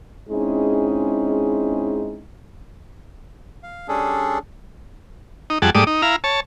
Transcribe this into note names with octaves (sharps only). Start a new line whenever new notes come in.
G#3 C4 C#4 D#4 E4 G#4
F5
G3 C#4 D4 G#4 A4
D#4
F2 G3 G#4 F#5 A5
G#2 G3 A3 D5 D#6
D#4
E4 F5 A#5
C#5 A5